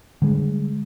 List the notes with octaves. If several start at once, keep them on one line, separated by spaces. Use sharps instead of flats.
D3 G3 G#3